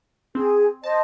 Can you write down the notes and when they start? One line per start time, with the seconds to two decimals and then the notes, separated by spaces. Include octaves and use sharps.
0.35 C4 G#4
0.84 C5 D#5 A5